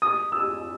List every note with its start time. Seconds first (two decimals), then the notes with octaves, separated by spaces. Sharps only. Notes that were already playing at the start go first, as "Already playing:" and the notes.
0.02 D#6
0.32 E6